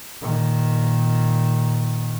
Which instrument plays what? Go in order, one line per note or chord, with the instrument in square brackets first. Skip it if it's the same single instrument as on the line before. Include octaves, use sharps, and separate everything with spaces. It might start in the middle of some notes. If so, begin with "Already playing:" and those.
[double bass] A#2 D#3